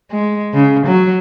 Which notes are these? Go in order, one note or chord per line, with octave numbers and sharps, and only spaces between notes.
G#3
C#3
F#3